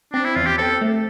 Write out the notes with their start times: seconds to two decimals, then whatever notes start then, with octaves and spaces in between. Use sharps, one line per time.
0.13 C4 D4
0.24 E4
0.36 E2 F4
0.47 G4
0.58 C4 A4
0.81 A3